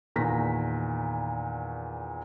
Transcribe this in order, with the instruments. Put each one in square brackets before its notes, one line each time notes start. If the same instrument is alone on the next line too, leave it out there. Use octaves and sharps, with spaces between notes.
[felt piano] E2 A#2 D#3 A#6 B6